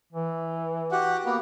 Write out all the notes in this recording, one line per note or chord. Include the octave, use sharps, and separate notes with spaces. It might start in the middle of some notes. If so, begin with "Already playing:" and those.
E3
F#4 G4 F#5
A#3 B3